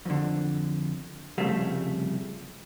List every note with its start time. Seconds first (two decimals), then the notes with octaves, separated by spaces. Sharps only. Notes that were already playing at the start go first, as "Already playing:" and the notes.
0.05 F2 D3
1.38 C2 F2 C#3 G3 A3 F5